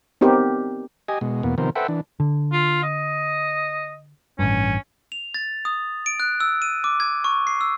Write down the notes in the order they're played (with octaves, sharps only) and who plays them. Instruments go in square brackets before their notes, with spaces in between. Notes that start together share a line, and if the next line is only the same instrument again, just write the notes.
[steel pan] B3 C4 D#4 G4 A#4
[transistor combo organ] G4 D#5 G#5
B2 G#3
E2 B2 A#3 B3
C3 D#3 F3 B3 A#4 C5
A4 B4 C5 E5 F#5 G5
E3 D4
[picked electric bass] D3
[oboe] F4
D#5
[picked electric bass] A1 G2 [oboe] C#4
[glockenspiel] F7
A6
D#6
D7
F#6
E6
D#7
D6
G#6
C#6
C7
E6